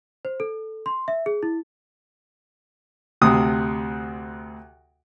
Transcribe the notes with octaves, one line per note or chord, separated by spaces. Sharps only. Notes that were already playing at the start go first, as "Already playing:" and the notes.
C5
A4
C6
E5
G#4
E4
D2 C3 D#6